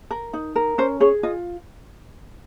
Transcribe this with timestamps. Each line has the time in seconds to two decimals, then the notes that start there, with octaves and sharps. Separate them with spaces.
0.11 A#4
0.33 D#4
0.56 A#4
0.78 C#4 C5
1.00 G#4 C#5
1.23 F4 D#5